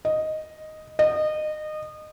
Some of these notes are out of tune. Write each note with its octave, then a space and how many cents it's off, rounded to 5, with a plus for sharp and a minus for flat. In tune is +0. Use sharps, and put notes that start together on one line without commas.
D#5 +0
D#5 -25